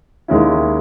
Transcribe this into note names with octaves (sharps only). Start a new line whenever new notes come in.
D#2 D#3 G#3 C#4 E4